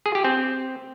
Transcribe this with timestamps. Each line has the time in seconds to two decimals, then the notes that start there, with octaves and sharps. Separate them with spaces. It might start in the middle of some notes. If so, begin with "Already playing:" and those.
0.06 G#4
0.15 G4
0.25 C4